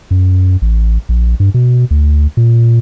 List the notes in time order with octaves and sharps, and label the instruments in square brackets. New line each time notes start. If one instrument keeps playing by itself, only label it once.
[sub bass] F#2
A1
A#1
G2
B2
D2
A#2